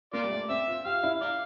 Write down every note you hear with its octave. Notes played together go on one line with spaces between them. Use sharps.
A#3 F4 D5
G3
A3
C4 E5
F4
G4 F5
E4
D5 F5